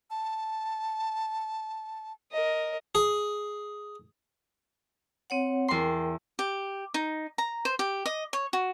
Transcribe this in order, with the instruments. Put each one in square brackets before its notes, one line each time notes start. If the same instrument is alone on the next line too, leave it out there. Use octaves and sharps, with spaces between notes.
[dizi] A5
[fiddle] A#4 D#5
[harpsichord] G#4
[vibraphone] C4 C#5 F#5
[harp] E2 C6 [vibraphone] A#4 G5
[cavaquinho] G4
D#4
A#5
C5
G4
D#5
C#5
F#4